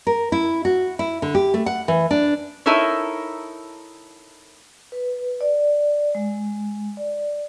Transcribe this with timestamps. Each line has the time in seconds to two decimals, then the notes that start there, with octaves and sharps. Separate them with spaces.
0.07 A#4
0.32 E4
0.65 F#4
0.99 E4
1.22 D3
1.35 G4
1.54 A3
1.66 F#5
1.88 E3
2.11 D4
2.66 D#4 E4 A4 A#4 C#5
4.92 B4
5.41 D5
6.15 G#3
6.97 D5